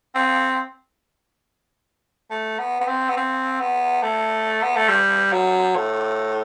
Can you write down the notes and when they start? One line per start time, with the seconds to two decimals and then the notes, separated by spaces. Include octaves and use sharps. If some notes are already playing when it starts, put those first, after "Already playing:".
0.15 C4
2.30 A3
2.59 B3
2.81 B3
2.87 C4
3.09 B3
3.17 C4
3.60 B3
4.03 A3
4.63 B3
4.76 A3
4.89 G3
5.32 F#3
5.76 A2